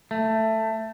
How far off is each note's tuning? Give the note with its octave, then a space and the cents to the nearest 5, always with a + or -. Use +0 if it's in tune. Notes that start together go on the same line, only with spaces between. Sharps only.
A3 +10